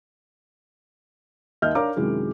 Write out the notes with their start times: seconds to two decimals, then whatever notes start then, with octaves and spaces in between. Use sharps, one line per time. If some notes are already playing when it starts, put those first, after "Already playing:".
1.62 D#2 D#5 E5 F6 G6
1.75 D4 A#4 C#5 F5 A#5 D6
1.96 F#2 C3 D#3 F#3 G#3 E4